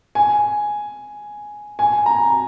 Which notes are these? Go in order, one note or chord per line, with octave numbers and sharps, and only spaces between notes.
G#5
G#5
A#5